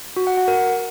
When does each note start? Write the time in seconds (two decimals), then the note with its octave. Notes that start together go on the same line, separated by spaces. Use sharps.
0.16 F#4
0.27 F#5
0.37 F#5
0.48 A#4